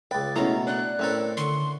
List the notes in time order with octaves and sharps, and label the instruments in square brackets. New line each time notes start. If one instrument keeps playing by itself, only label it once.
[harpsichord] C#2 B4 [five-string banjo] G5 [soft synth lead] A6
[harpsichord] B2 A3 [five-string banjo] G#3 C#4 [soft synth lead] E4 [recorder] A#5
[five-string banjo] D4 [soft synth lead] D5 [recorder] F#6
[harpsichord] A2 C4 A4 [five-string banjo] C#4 E4 A#4
[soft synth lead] D3 [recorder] C6 [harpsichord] C#6